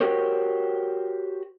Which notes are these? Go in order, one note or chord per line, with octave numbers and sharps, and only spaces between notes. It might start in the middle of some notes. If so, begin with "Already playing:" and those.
F#4 G4 A#4 C5 C#5